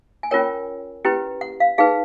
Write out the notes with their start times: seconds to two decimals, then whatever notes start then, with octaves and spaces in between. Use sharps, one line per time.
0.23 G#5
0.31 C#4 F4 A#4 C#5 G5
1.05 C#4 E4 G4 B4
1.41 F#5
1.60 F5
1.78 D#4 G#4 B4 F5